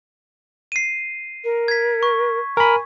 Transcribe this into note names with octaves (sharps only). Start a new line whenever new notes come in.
C7 D#7
A#4
G#6 B6
C#6
A#4 G#5 B5